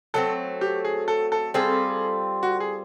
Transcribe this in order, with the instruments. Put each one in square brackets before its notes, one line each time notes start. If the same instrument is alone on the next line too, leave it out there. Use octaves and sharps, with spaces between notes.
[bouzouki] F#3 A3 C4 [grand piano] A4
[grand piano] G4
G#4
A4
A4
[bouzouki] G3 C4 F4 A4 [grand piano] G#4
[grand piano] F#4
G#4